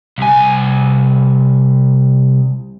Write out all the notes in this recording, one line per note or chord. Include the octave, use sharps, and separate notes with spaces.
C2 G#5